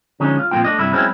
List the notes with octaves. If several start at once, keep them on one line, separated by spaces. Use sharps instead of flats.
D3 F3 G#3 C#4 D#4
F4
F2 A#2 D#3 A#3 F4 G5
A3 D4 D#5
G2 C3 E4
F#3 G#3 C4 C#4 E4